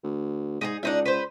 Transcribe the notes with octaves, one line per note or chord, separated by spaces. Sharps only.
D2
G#2 D#4 G4 G#4
C#2 D4 D#4 E5
B4 C5